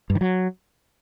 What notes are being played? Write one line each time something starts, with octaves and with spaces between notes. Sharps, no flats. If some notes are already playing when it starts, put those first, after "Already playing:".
G2
D#3
F#3